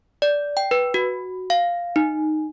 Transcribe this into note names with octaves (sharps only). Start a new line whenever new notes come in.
D5
G5
B4
F#4
F5
D#4